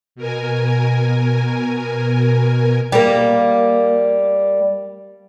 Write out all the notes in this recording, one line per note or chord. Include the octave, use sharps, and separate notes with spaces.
B2 A#4 G#5
G3 A#3